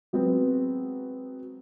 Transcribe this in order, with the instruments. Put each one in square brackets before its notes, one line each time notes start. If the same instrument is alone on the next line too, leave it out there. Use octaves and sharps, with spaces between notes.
[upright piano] F#3 G#3 B3 C4